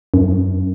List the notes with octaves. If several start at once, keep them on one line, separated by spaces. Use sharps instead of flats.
F#2